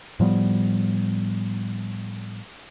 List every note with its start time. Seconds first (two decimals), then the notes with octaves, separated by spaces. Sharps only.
0.20 A2 F3 G3 B3